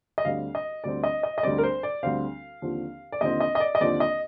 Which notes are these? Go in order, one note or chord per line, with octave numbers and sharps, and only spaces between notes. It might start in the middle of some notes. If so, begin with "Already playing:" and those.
D#5
D2 D3 G3 C4 F5
D#5
D2 D3 G3 C4 D5
D#5
D#5
D#5
D2 D3 G3 C4 D5
A#4
C5
D5
D2 D3 G3 C4 F5
D#2 D3 F3 C4
D5
D#2 D3 F3 C4 D#5
D#5
D#5
D5
D#5
D#2 D3 F3 C4 D5
D#5